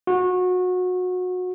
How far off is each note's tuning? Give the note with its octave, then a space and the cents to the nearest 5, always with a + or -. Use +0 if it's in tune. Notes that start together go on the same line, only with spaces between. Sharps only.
F#4 -25